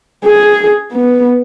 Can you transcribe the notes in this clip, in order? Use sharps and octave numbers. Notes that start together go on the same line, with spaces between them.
G#4
B3